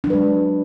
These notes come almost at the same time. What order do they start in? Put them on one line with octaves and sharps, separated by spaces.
D4 F#3 B4 G#3